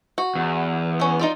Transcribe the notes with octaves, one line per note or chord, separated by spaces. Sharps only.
F#4
E2
B3 C#4
D#4 F4 D5